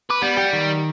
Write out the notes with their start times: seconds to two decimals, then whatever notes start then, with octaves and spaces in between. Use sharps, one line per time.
0.10 B4 D6
0.22 G3 B3
0.37 G4 F#5
0.53 D#3